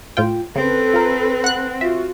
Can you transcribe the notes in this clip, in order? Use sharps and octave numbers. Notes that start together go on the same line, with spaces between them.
A2 F4 G5
C#3 C4 A4 B4
F4 A#4
F#5 F#6
F4 F#4 E5